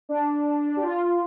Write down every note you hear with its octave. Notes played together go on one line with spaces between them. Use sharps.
D4
G4
F4